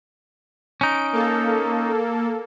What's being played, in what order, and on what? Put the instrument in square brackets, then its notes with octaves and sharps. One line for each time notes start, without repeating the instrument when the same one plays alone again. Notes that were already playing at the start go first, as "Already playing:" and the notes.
[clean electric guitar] C#4 D#4 [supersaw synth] D7
[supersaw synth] A#3 A4